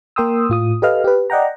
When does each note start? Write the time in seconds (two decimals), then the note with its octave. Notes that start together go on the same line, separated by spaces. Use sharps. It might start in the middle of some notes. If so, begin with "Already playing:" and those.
0.16 A#3 A#4 G5 C6 D#6 E6
0.49 A2 F4 D#6
0.82 G4 A4 B4 D#5 F5 F6
1.04 G4 B4
1.30 D5 D#5 F#5 G5 A#5